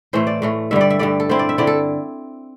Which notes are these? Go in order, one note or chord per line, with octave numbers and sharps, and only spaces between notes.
A2 E3 A3 C5
D5
A2 E3 A3
G2 D3 G3 E5
D5
E5
G2 D3 G3 D5
A4
D3 C4 E4 C5
D5
E5
D3 C4 E4 D5
A4